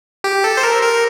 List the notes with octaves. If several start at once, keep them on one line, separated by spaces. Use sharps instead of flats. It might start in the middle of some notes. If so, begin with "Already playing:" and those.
G4
A4
C5
A#4
A#4